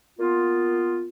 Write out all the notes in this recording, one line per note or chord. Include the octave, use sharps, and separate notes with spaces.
A#3 B3 F4